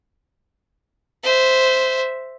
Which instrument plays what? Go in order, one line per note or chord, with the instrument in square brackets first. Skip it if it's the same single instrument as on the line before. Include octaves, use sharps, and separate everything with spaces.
[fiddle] C5 E5